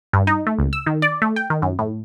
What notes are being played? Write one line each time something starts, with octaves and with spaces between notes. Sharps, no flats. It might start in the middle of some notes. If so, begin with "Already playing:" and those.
G2
D#4
A3
C#2
E6
D#3
D5
A3
G5
D#3
F#2
A2